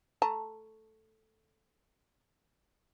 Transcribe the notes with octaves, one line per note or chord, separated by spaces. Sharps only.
A3 A5 A#5